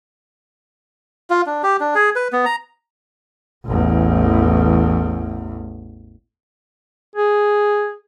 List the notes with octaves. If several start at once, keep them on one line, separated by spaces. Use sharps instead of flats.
F4
D4
G4
D4
G#4
B4
B3
A#5
A1 E2
G#4